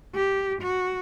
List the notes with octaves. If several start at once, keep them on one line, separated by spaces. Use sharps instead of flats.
G4
F#4